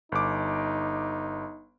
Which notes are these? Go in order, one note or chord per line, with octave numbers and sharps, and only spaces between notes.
G1 D#4 D6